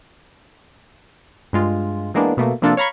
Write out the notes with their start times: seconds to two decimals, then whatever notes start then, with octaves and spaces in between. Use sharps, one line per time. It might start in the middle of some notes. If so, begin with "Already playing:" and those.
1.53 G2 G#3 F4
2.14 E3 G#3 A#3 B3 D4
2.37 B2 A3 A#3
2.62 C3 F3 A#3 D4 F4 A4
2.77 C#5 F5 A#5 B5 C#6